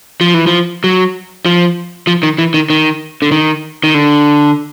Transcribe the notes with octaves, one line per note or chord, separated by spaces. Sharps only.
F3
E3
F3
F#3
F3
F3
D#3
E3
D#3
D#3
D3
D#3
D#3
D3